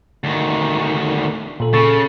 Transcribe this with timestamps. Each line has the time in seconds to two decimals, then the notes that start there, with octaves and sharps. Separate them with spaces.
0.24 D2 D#3
1.60 A#2 A4
1.73 C#3 A4 C#6 A6